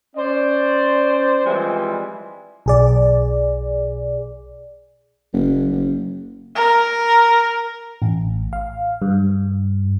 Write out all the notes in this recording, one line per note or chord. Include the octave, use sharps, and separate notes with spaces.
C#4 C5 D5
E3 F3 G3 G#3 C4 E4
B1 G#4 D5
F#1
F#1
A#4
A1
F5
G2